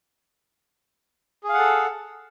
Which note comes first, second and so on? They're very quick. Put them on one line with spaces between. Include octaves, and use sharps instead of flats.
G#4 F5 F#5 A4